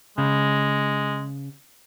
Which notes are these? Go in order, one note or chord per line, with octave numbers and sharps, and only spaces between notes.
C#3 G#3